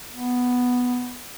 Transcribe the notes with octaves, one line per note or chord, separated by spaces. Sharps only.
B3